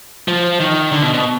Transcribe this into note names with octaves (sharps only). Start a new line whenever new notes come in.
F3
D#3
D3
B2
B2